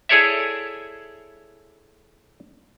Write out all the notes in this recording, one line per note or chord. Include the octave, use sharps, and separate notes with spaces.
E4 G#4 A4 C#5 D5 E5